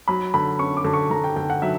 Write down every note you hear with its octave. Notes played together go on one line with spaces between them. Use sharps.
F#3 B5
D3 B5
C#4 C#6
D6
D3
C#6
D3 A#5
G5
D3 G5
F#5
F#3 E5